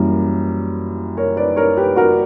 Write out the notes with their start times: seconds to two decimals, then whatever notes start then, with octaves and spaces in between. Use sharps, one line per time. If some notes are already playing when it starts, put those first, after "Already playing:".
Already playing: F#2 E3 G3 A#3
1.17 A#4 C#5
1.37 B4 D5
1.56 A#4 C#5
1.77 G4 B4
1.96 F#4 A#4